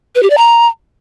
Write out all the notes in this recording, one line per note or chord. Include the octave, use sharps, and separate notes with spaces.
B4
G4
D5
A#5